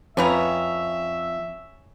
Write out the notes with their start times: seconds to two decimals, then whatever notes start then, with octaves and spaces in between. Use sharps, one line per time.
0.17 F2 C#4 B4 E5 A#5